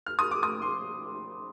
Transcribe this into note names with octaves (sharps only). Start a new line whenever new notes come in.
F6
D#6
D6
D#6
C6